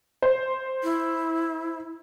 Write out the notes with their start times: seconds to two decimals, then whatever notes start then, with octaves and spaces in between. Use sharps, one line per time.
0.22 C5
0.83 E4